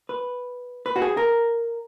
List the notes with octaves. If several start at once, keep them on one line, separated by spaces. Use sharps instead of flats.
B4
B4
F#4
G#4
A#4